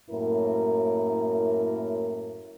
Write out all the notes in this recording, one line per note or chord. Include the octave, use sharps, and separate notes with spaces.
F#2 A2 A#3 E4 A#4